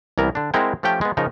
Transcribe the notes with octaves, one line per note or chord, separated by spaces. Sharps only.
C2 E3 B3 A#4
D3 D4
G#3 C4 E4 A#4 F#5 G5
F3 A3 C#4 G4 G5
G#3 B3
C#3 F3 D#4 A#4